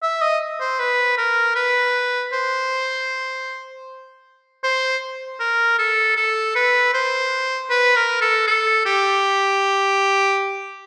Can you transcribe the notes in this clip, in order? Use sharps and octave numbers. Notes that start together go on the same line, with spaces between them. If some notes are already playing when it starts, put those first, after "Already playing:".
E5
D#5
C5
B4
A#4
B4
C5
C5
A#4
A4
A4
B4
C5
B4
A#4
A4
A4
G4